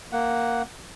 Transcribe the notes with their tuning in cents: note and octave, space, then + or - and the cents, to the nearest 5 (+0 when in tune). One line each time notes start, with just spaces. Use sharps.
A#3 +0 F#5 +0